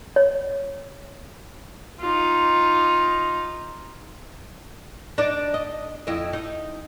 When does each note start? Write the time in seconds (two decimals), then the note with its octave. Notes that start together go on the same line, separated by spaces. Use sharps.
0.16 C#5
2.00 D#4 F4
5.18 D4 D#4 D5
5.54 D#5
6.07 F2 E4 D#5
6.33 D#4